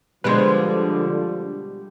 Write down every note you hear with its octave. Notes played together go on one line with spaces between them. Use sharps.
B2 D3 F3 G3 G#3 B4 C5